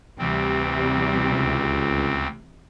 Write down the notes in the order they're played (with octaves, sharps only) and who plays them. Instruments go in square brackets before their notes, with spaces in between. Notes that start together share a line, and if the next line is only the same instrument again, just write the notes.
[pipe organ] D2 C4 [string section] C3 E3 G3
[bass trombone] C#2